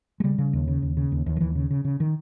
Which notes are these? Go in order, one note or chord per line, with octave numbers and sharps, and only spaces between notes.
G#3
C#3 G3
C#3
D#2
C#3
D#2
C#3
D#2
D#2
D#3
D#2 E3
C#3
C#3
C#3
D#3